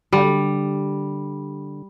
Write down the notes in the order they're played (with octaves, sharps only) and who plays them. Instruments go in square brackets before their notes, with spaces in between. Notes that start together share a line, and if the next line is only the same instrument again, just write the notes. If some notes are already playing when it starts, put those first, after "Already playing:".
[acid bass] D3 [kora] G3